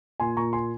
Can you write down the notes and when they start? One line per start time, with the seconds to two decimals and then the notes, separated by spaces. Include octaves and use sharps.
0.20 A#2 G#5 C6
0.37 A#2 A#5 C#6
0.53 G#5 C6